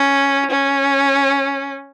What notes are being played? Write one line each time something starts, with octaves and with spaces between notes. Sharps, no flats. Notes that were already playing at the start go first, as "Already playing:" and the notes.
Already playing: C#4
C#4